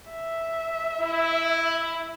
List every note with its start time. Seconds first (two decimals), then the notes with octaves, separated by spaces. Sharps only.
0.11 E5
1.00 E4